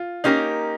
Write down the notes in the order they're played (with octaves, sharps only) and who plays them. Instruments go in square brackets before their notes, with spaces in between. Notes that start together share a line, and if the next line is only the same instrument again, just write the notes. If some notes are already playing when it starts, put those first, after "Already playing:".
Already playing: [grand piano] F4
[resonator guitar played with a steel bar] A#3 C#4 G4 A#4 [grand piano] D#4